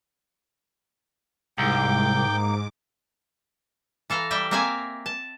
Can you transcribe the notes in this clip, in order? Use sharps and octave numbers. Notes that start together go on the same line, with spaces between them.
C2 G#2 A#3 D#4 G5 D6
E3 A4 F5 A#5
G3 D5 E5 G5
A#3 C4 A#4 E5 F5 G#5
A5